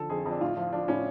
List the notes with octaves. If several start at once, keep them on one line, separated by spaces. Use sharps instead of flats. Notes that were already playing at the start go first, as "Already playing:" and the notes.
Already playing: D3 F3 A4
F2 G#4
F2
D4
A2 F4
F3 F4
F3 D4
A2 C#4